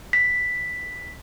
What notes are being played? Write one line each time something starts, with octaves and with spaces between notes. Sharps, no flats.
B6